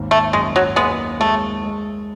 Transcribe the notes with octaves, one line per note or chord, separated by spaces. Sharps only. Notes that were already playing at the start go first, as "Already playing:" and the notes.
Already playing: G#1 D#2
A3
F#2 G#3
F#3
D#2 G#3 B3
G#3 A3
G#3